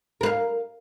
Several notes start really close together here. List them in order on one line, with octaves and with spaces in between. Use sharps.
A#4 B4 F5